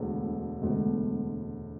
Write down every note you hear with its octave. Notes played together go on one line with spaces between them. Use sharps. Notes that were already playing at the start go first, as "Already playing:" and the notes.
Already playing: E1 D2 D3
E1 D2 D3